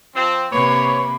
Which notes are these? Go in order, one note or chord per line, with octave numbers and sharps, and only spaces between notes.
F3 C4
C3 A#3 B4 C#5 B5